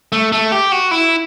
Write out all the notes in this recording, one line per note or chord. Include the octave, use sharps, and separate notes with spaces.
A3
A3
G4
F#4
E4